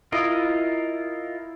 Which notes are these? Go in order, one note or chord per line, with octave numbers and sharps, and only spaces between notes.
E4 F4 A#4 D#5